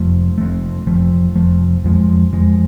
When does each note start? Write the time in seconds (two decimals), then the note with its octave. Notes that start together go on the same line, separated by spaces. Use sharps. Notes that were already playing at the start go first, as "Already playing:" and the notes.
Already playing: F1 F2 F3 A3
0.38 F1 F2 F3 A3
0.87 F1 F2 F3 A3
1.36 F1 F2 F3 A3
1.84 F2 F3 G#3
2.33 F2 F3 G#3